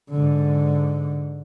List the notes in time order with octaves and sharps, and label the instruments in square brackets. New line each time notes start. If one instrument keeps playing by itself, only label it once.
[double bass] G#2 D3